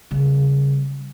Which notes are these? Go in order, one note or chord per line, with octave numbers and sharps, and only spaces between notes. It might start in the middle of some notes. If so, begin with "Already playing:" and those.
C#3 G3